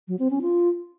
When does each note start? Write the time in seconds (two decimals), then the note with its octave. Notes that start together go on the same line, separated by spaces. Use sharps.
0.08 F#3
0.19 C4
0.30 C#4
0.42 F4